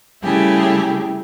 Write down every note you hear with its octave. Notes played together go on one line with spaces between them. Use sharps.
C#3 G3 A3 E4 G4 G#4